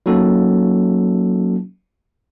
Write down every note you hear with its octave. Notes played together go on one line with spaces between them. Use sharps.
F#3 A#3 C#4 D#4 F#4 A4